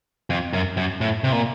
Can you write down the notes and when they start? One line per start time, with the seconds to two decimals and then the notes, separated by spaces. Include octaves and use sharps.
0.30 F2
0.53 F#2
0.77 F#2
1.01 A2
1.24 C3
1.32 A#2